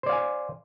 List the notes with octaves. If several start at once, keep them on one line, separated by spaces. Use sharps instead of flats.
C5 D5 F5 G#5